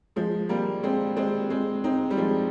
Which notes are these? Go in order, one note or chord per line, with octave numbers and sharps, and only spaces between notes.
F3 G#3
G3 A#3
G#3 C4
G#3 C4
G#3 C4
C4 D#4
G3
F3 G#3